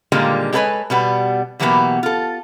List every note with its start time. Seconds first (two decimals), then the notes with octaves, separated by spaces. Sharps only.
0.12 A#2 D3 D#3 G3 G#3 A#3
0.53 G#3 G4 A4 B4 C#5 G#5
0.90 B2 G3 B3
1.59 B2 E3 F#3 A#3 B3 G4
2.03 F4 A4